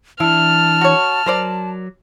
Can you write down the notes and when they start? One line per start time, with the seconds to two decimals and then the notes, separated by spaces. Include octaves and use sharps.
0.20 E3 D4 E4 A5 F6
0.81 F#4 C#5
1.26 F#3 A#4 C5 D5